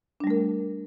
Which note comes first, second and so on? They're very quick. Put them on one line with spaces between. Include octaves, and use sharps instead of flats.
D4 G3 A3 A#4